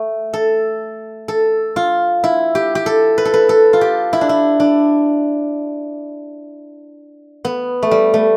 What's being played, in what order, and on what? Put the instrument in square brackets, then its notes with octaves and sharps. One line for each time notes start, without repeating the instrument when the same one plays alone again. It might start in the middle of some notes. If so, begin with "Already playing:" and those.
Already playing: [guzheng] A3
A4
A4
F4
E4
G4
G4
A4
B4
A4
B4
A4
F4
G4
E4
D4
E4
D4
B3
A3
G3
A3